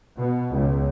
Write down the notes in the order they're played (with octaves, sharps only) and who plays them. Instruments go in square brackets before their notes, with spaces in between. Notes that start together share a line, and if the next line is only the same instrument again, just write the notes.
[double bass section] B2
C#2